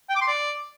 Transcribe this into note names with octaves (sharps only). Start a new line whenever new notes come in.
G5
D6
C6
D5